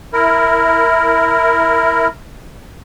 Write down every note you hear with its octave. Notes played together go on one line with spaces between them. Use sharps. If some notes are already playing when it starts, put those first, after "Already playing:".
E4 A#4